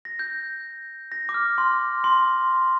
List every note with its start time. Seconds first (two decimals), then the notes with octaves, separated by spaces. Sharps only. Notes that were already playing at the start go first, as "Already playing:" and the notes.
0.05 A#6
0.19 G6
1.12 A#6
1.29 D6
1.34 F6
1.58 C6
2.04 C6